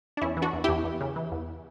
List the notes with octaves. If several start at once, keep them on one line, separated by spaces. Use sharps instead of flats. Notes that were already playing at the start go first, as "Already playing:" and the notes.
D4
E2 C#4 E4
E3
D4 F#4
E2
E2 E4 G4
E2
C#3
E3
E2